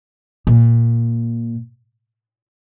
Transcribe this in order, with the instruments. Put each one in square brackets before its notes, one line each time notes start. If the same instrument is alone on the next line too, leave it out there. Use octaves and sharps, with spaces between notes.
[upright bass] A#2